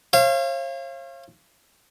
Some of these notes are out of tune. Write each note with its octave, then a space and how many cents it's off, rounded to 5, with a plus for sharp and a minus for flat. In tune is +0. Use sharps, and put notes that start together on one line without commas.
C#5 -45 F5 -30